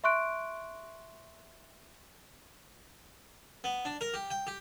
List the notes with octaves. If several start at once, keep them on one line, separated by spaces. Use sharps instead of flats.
E5 C6 C#6 F#6 D7
B3
D4
A#4
G4
G5
G4